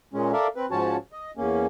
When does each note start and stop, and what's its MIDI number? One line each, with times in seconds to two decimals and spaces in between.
0.14 0.32 46
0.14 0.32 56
0.14 0.32 61
0.33 0.47 69
0.33 0.47 70
0.33 0.47 74
0.33 0.47 76
0.33 0.47 77
0.56 0.66 60
0.56 0.66 71
0.71 0.97 44
0.71 0.97 53
0.71 0.97 61
0.71 0.97 66
0.71 0.97 73
0.71 0.97 81
1.12 1.31 75
1.37 1.66 40
1.37 1.66 58
1.37 1.66 61